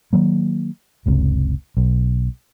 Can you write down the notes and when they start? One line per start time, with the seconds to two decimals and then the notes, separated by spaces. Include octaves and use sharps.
0.13 D#3 F#3 A#3
1.06 F#1 C#2 C3
1.77 B1